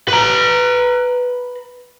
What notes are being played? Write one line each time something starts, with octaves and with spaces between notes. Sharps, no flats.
B4 A#5